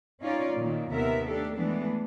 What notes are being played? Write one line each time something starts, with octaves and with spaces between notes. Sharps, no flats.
C#4 D#4 F4 C#5 D5
A#2 D#3 A#3
D#2 C3 B3 A#4 E5
A3 D4 G4 A4
E3 G#3 A3 B3 D4